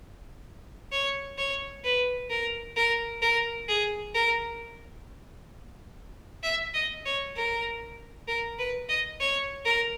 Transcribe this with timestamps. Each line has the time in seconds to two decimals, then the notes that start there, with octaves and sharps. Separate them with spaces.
0.92 C#5
1.38 C#5
1.84 B4
2.30 A#4
2.76 A#4
3.22 A#4
3.68 G#4
4.14 A#4
6.43 E5
6.74 D#5
7.06 C#5
7.36 A#4
8.28 A#4
8.59 B4
8.89 D#5
9.20 C#5
9.65 A#4